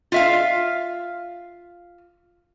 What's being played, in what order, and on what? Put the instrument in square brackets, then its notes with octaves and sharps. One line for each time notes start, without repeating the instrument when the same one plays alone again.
[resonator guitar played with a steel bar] F4 E5 F5